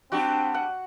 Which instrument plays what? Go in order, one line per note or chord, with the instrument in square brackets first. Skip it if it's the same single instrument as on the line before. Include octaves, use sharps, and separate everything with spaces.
[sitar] G3 D4 G4 [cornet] C4 [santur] F#4
[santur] F#5